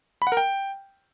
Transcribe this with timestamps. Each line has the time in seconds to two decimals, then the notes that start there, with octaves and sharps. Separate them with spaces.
0.22 B5
0.27 F#5
0.32 A#4
0.37 G5